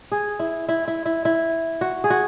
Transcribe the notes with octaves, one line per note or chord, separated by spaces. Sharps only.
G#4
E4
E4
E4
E4
E4
F#4
G#4
F#4